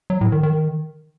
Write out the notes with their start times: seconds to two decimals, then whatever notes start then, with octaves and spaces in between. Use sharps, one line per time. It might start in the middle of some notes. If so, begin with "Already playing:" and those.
0.10 F#3
0.21 A2
0.32 D#3
0.43 D#3